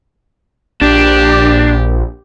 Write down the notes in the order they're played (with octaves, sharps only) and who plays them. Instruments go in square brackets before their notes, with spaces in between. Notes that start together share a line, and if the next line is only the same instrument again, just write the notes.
[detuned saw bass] A#1 [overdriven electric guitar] D4 [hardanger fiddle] G4